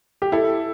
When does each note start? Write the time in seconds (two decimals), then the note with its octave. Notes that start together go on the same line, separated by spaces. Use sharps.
0.22 G4
0.32 E4 A4